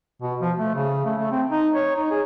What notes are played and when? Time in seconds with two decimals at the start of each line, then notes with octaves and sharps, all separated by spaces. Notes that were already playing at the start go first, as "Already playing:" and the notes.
0.22 B2
0.41 F3
0.58 A3
0.75 C#3
1.05 A3
1.17 A3
1.31 C4
1.50 D#4
1.75 C#5
1.96 D#4
2.10 G#4